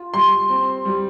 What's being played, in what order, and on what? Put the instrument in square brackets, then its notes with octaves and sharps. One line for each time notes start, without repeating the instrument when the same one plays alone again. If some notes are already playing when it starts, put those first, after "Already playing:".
Already playing: [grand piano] F4
[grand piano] G3 [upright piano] C6
[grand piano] C4
G3